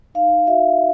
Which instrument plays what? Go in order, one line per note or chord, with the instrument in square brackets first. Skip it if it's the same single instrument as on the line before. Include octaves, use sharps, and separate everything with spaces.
[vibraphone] D#4 F5
F#4 E5